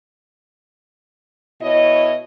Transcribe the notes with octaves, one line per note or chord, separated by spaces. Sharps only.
B2 E4 C#5 D#5